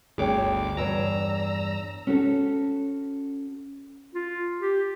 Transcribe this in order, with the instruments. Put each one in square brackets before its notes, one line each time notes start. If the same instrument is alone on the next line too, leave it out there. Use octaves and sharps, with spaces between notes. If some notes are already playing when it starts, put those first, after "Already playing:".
[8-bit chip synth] G1 D2 D6 [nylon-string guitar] G#4 C#5 G5
[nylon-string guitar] E2 G2 C#5 [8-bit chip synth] A#5 E6
[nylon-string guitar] C#4 F#4 A4
[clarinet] F4
G4